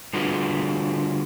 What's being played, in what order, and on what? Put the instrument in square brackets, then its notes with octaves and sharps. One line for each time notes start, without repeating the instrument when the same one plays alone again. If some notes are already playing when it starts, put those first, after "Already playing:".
[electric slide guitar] D3 G3 F4 F#4 G#4 B4